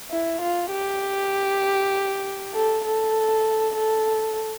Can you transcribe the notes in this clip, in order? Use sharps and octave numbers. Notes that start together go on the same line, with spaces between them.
E4
F4
G4
A4
A4
A4